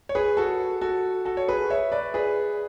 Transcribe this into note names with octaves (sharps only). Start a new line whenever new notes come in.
C#5
G#4 B4
F#4 A4
F#4 A4
F#4 A4
C#5
G#4 B4
C#5 E5
B4 D5
G#4 B4